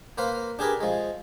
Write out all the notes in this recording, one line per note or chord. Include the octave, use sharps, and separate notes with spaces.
A#3 B4 C5 F5
D4 G4 G#4 A#4 B4
F3 G#3